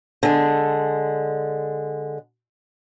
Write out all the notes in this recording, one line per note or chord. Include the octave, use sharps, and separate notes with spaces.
D3 G#3